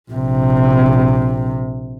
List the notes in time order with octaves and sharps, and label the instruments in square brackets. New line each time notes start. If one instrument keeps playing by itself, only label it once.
[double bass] A#1 C3